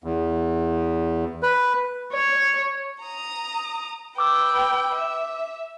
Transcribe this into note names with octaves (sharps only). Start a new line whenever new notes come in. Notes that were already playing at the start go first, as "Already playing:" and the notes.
E2
B4
C#5
A#5 D#6
B4 G5 D6 E6
E5